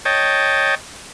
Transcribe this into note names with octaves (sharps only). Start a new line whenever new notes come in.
C#5 D#5 G5 A5